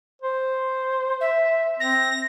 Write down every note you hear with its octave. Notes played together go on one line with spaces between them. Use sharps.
C5
E5
C4 A#6